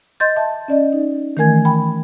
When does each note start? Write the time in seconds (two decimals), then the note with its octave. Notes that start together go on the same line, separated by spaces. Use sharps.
0.20 D#5 C6 G6 A6
0.37 E5 A5
0.68 C#4 D5 D#5
0.93 D#4
1.37 D#3 E3 A3 A#4 G#5 G#6
1.65 G5 B5